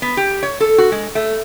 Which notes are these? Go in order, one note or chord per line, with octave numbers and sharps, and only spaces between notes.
B3
G4
C#5
A4
F#4
G#3
A3